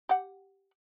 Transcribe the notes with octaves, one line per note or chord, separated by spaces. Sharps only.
G4 F#5